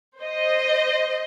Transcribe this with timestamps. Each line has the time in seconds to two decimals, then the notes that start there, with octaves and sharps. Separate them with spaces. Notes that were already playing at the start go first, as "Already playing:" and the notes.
0.19 C5 D#5